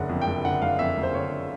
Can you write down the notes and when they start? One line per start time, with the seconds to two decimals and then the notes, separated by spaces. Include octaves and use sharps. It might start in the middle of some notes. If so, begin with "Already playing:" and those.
Already playing: F#1 D3 F#5
0.09 F2
0.21 G5
0.27 F#1
0.44 D3 F#5
0.62 F#1 F5
0.79 F2 E5
0.97 F#1
1.03 C5
1.14 D3 C#5